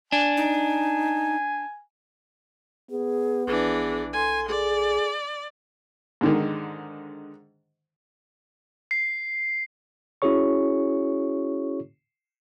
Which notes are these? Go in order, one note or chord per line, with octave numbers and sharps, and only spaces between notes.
D4 G#5
D#4
B3 G#4
A#1 E3 D4 G#4
A4 G#5 C6
G#4 D5
G#2 D3 D#3
C7
C#4 E4 F#4 G#4 C#5 C#6